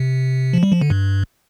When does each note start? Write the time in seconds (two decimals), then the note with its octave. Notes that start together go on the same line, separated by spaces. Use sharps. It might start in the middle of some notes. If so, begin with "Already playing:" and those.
Already playing: C3
0.53 F3
0.63 G3
0.72 F3
0.81 D3
0.90 G2